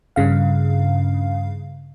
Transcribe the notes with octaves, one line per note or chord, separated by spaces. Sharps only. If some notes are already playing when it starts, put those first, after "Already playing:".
G2 C#3 F5